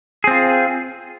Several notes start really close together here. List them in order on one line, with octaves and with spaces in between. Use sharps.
G#4 C4 F4